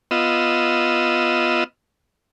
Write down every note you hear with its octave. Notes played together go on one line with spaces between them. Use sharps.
B3 F4 D#5 E6